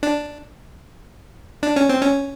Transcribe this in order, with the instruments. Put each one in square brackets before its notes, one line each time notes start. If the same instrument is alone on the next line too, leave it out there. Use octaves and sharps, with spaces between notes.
[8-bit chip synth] D4
D4
C#4
C4
C#4